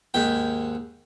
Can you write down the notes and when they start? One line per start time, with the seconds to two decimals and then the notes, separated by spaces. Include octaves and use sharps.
0.14 D#2 G#2 G5